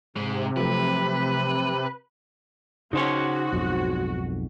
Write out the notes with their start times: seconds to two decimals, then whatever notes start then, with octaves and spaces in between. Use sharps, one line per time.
0.16 G#2 C3 G#3
0.57 F3 F#3 A3 B4
2.93 C#3 D#4 F#4 C5 C#5
3.53 B1 F2 G#2